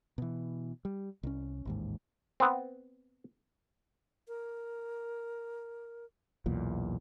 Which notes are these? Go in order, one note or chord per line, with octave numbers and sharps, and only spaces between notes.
B2 E3
G3
C2 C#4
A1 D#2 G#2
B3 C4
A#4
B1 E2 A#2